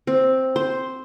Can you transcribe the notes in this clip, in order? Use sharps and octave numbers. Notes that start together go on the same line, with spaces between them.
C4
C5